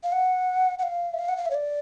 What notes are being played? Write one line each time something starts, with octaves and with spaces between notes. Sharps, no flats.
F5
F#5
F#5
F5
E5
F5
F#5
F5
E5
C#5
D5